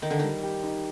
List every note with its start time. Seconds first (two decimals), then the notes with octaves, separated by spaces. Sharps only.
0.02 D#3 D#4
0.10 D3
0.19 D#3 G3
0.43 G4
0.63 D#4